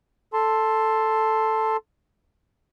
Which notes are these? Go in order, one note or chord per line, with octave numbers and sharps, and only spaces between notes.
A4 A5 C6